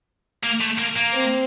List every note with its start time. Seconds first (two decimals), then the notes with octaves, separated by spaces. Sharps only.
0.44 A#3
0.61 A3
0.78 A#3
0.97 A#3
1.14 C4